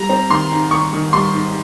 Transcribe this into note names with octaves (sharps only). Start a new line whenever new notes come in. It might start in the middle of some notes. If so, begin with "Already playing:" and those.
Already playing: G3 A#5
C4
D#3 C6
G#2
D#3 C#6
D#3
G3 C6
G#2